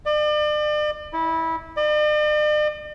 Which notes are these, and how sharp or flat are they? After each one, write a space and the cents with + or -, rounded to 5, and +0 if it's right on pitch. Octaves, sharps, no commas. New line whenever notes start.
D5 +40
E4 -20
D5 +45